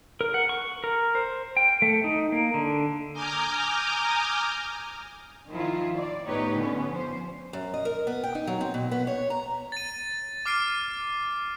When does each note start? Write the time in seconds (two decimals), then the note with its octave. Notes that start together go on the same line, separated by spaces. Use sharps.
0.21 A#4
0.34 F#5
0.49 C#6
0.84 A#4
1.15 C5
1.57 G5
1.82 A3
2.04 D#4
2.32 A#3
2.54 D3
3.13 G#5 A#5 D6 D#6 F6 G6
5.49 D#3 F3 E4 F4
5.95 D5
6.25 A2 B3 D#4 G4 B4 C#5
6.56 D3 B3 C#4
6.88 F3 C5
7.53 F#2
7.74 D#5
7.85 A#4
8.07 B3
8.24 G5
8.35 D#4
8.47 F#3
8.61 C4
8.74 B2
8.91 B3
9.07 C#5
9.30 A#5
9.72 A6 D#7
10.45 D6 F6 C7 D7 D#7